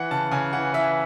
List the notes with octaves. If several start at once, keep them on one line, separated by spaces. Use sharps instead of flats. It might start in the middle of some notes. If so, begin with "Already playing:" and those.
Already playing: E3 F#5
C#3 A5
C#3 G#5
E3 F#5
E3 E5